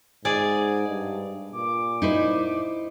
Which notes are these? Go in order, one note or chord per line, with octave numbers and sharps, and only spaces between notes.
G#2 G#4 D5
G2
A#2 D6
D#4 E4 C5